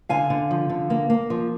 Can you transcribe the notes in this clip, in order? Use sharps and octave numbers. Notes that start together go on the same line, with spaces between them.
D3 F5 G#5
D3
F3
D3
A#3
A#3
F3